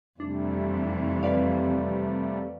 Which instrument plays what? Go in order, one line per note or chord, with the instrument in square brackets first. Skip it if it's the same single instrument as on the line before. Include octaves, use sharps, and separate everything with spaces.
[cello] F2 E3 [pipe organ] C3 G3 A3 [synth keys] D4
[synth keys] B4 D5 F5